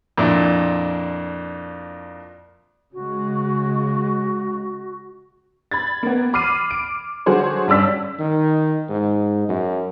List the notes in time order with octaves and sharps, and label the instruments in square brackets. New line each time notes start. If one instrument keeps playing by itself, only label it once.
[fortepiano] F2 A#2 D4 E4
[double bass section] C#3 G#3 [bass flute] F#4
[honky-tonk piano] B5 G#6 A6
A#3 B3
B5 D6 F6 C7 D#7
D7
D3 F#3 F#4 G#4 C5 C#5
G2 C#4 D5 E6 B6
[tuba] D#3
G#2
F#2